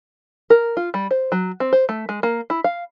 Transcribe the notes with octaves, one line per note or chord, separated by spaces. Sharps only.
A#4
F4
G3
C5
F#3
C4
C5
A3
G#3
A#3
E4
F5